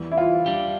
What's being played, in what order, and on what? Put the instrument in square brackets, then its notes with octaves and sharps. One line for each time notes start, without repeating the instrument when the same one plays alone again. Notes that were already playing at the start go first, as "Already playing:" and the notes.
Already playing: [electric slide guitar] E2 E3 G3
[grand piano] E4
F4
[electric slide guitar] G3 D4 G4